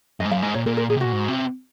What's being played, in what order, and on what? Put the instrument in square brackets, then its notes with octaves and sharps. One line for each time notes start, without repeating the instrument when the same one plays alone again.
[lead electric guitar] F#2 [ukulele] D#5
[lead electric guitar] G#2
[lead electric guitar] F#2 [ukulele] F5
[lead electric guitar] G#2 [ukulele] D#5
[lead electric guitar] A#2 [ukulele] C#5
[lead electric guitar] A#2 [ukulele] A#4
[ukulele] A#4
[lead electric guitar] A#2 [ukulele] G#4
[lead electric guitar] C3
[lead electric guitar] A#2 [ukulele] F#4
[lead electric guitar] G#2
C3